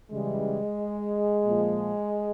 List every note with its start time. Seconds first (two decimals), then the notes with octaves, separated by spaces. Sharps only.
0.11 C#3 E3 G3 G#3
1.45 A#2 F3